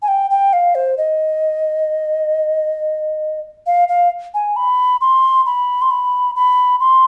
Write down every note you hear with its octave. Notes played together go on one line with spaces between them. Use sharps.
G#5
G5
G5
F5
C5
D#5
F5
F5
G#5
B5
C6
B5
C6
B5
B5
C6